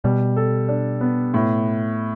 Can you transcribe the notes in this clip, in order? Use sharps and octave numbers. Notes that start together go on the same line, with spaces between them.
B2 G3
A4
D4
B3
A2